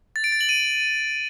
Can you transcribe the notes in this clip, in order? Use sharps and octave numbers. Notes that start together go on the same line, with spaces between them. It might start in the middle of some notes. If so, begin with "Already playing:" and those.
A6
D7
A6
F#7
D#7